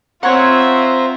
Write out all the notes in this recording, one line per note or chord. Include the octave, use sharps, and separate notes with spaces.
C4 F4 C5 C#5 E5 F#5 A#5